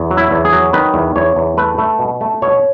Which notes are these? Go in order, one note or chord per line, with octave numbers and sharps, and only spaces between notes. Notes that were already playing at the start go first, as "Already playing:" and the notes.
Already playing: E2
F#3
E4
E2
G#4
F#3
D#3 B4
E2
E2 C#5
E2
A3 B4
A3
B2
A3
B2 C#5